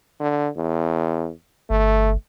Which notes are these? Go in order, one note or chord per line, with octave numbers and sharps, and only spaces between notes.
D3
E2
G1 A3